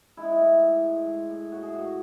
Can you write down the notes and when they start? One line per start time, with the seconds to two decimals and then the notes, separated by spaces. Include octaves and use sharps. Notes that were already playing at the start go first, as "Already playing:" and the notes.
0.17 G#3 E4
0.25 D#4
0.33 E4
0.40 A2
0.62 A2
0.85 G#3
1.07 G#3
1.29 A2
1.52 A2 F#4
1.63 G#4
1.74 A2 F#4